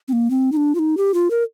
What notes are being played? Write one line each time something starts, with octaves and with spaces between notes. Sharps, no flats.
C4
A#3
C4
D#4
D4
F4
D#4
G4
F4
A#4